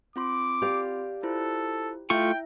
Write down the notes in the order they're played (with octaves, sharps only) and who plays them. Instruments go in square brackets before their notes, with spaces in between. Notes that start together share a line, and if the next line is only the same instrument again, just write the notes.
[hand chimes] C4 F4 C6 [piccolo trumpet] D6
[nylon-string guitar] G4 D5 F5
[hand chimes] E4 F4 C5 [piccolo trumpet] A4
[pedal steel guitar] A3 F4 C#6 [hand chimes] E4 E5 [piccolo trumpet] G5